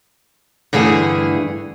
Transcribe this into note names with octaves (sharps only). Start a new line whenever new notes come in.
G2 D3 E3 A3 G#4